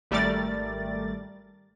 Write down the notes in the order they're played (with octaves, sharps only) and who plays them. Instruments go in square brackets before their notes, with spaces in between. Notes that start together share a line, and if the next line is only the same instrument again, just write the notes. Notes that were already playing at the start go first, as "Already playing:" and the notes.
[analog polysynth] G#1 G3 A3 A#4 D5 A6